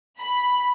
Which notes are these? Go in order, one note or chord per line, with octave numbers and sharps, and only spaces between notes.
B5